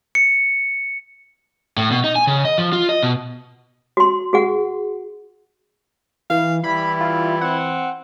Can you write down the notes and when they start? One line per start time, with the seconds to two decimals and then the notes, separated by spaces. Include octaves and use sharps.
0.15 C#7
1.77 A2
1.91 B2
2.04 D#4
2.16 G#5
2.27 C#3
2.45 D#5
2.58 F3
2.73 F4
2.89 D#5
3.03 B2
3.97 F#4 C6
4.33 F#4 G#4 F#5
6.30 E3 F5
6.64 E3 G3 E4 B5
7.00 F4
7.41 C4 F#5